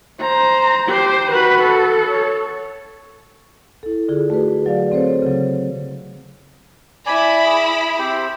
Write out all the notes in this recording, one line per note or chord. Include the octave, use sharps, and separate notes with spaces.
C5 A#5
G4 C5
F#4 B4 B5
A4
C#5
E4 A4
D3 F4 G#4
A3 F#4 G#4 B4
F#3 D5 F5
C4 A4 C5 C#5
C#3 F#3
E4 D5 G#5 B5
G#4
C4 G4 C5